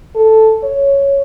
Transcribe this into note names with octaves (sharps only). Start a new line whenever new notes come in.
A4
C#5